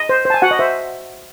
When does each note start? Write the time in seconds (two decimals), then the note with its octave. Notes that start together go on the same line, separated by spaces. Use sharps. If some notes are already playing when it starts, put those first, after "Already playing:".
Already playing: D#5
0.09 C5
0.25 C5 A5
0.34 G#5
0.42 F#4 F#5
0.51 D#5
0.59 C5 E5